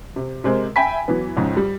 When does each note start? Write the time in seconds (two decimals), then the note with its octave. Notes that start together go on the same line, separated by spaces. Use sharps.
0.16 C3
0.44 C3 G#3 C4 A#4
0.76 E5 G5 G#5 B5 B6
1.08 E3 F#3 B3
1.37 F2 G#2 C#3
1.57 G3